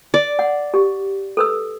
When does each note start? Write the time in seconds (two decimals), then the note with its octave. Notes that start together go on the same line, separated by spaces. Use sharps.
0.14 D5
0.39 F#5
0.74 G4
1.37 A4 B4 E6